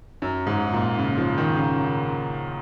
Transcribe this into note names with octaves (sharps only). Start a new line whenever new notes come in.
F#2
G#2
A#2
C#3
F3
D#3
C#3